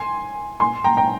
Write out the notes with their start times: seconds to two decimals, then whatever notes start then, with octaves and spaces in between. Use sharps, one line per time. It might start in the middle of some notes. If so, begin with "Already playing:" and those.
Already playing: G#5 C6
0.60 G#5 C6
0.84 G5 A#5
0.97 G5 A#5